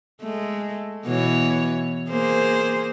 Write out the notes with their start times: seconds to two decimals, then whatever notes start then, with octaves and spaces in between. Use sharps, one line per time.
0.22 G#3 A3
1.06 B2 E3 C#5
2.09 A#3 G#4 C5